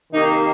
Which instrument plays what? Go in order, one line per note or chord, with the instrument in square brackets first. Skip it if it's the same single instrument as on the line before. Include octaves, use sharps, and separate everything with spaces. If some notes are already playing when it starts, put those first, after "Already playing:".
[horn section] C3 D#3 A#3 D#4